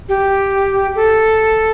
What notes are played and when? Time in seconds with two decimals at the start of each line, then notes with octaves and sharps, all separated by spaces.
0.09 G4
0.96 A4